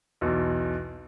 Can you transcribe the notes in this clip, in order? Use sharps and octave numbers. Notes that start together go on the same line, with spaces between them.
B1 E2 B2